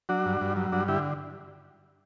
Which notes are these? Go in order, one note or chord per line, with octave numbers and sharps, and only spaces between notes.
F#3 D4 F#4
G2
G2
F#3
G2 D4 F#4
D3 E4 G4